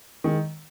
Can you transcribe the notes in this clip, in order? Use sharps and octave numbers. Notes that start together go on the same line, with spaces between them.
D#3 G#3